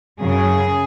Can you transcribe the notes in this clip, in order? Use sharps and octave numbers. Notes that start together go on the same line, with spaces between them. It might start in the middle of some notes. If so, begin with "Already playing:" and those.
F#2 C#3 F#3 G#4